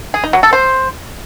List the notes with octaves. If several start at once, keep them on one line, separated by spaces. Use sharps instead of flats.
G#4
D#4
F#3
A4
C5